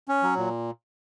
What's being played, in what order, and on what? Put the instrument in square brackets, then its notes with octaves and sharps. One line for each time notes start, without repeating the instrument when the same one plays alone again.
[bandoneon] C#4
F#3
A#2